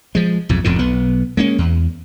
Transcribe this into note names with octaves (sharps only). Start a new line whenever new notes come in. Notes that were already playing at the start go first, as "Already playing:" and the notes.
F3 G#3
B1 F2 G#2
E1 F2 A2 D3
B1 B3
G#3 A#3 C#4
E2